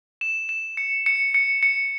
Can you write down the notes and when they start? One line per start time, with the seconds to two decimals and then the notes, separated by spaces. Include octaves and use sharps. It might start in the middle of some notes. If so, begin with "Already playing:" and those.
0.21 E7
0.49 E7
0.77 C#7
1.06 C#7
1.34 C#7
1.63 C#7